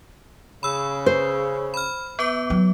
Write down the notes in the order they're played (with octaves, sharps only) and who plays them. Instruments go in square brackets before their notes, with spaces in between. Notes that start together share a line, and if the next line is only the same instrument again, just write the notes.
[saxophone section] C#3 [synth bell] B5 E6
[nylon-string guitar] C5
[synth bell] B5 F6
B3 B4 D6
[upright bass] F#3